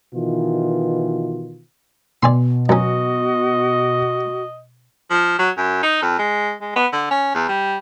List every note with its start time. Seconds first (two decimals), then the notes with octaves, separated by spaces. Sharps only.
0.14 B2 D#3 E3 F4
2.23 B2 D5 G#5 C6
2.69 F#2 C#4 F#4 D#5
5.10 F3
5.39 F#3
5.57 F#2
5.83 D#4
6.02 F2
6.19 G#3
6.61 G#3
6.76 B3
6.93 D3
7.11 C#4
7.35 E2
7.48 G3